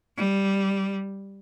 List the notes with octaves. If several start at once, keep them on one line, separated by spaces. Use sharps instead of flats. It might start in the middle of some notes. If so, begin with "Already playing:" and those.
G3